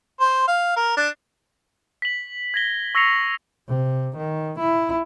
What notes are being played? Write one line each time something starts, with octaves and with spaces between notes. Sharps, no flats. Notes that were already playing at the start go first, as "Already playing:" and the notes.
C5
F5
A#4
D4
B6 F#7
G#6 A#6 G7
C#6 E6 A#6 C7 C#7 F7
C3
D#3
E4